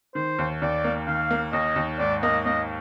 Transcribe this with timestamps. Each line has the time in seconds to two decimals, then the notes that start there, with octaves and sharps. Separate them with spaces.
0.15 D#3 C5
0.39 D#2
0.62 D#2 D5
0.84 A#3
1.07 D#3 F5
1.31 A#3
1.53 D#2 D#5
1.76 D#2
1.99 G#2 D5
2.23 A#3 D#5
2.45 A#3 D#5